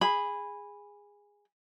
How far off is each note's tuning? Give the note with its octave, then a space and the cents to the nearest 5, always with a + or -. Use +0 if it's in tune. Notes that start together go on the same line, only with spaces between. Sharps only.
G#4 -15 B5 +0